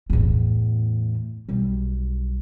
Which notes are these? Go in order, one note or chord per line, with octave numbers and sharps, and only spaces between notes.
E2 A2
B1 G3